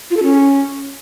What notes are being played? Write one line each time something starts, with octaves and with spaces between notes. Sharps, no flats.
F4
A4
C#4